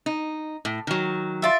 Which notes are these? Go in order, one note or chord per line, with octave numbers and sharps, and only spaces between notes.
D#4
A2
D#3 F#3
F4 D5 E5